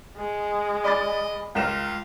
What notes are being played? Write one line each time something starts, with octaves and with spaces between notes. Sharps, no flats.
G#3
D5 D#5 B5 A6
C#2 F4 A#4 E7